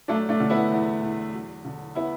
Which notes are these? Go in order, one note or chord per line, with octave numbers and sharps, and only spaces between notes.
F#3 A3 D4
A3 D4
D3
B3 E4
E2
E2
F#3
D3
B3 E4